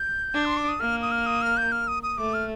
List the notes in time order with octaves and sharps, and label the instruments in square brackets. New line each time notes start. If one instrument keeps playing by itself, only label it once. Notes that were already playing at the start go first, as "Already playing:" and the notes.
Already playing: [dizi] G6
[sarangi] D4
[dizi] C6
D6
D#6
[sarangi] A#3 [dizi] F6
[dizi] D#6
F6
D#6
F6
G6
F6
D#6
D#6
[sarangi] A3 [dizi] D6
[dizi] F6